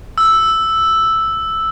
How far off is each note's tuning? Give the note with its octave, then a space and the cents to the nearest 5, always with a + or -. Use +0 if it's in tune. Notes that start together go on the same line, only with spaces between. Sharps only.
E6 +0